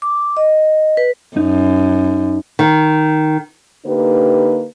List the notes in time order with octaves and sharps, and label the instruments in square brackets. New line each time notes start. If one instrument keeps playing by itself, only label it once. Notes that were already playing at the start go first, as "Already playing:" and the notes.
[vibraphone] D6
D#5
B4
[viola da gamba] F#2 [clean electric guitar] D#4
[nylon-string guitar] D#3
[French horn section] D3 A#3 D#4 G4 B4